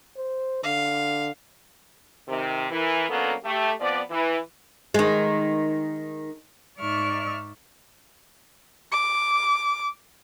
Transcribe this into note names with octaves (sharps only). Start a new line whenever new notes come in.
C5
D3 F5
C3 D#3
E3 A#4
F#3 A#3 B3 C#4 D4 A4
A3 G4
F3 B3 C4 D5
E3
D#3 G#3
G#2 D#4 D5 E5 C#6 F6
D6